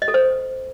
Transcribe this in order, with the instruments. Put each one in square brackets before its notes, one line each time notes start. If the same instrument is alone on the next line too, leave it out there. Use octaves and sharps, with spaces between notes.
[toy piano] D#5
A4
C5